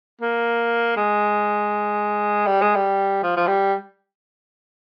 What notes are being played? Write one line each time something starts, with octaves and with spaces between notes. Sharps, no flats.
A#3
G#3
G3
G#3
G3
F3
F3
G3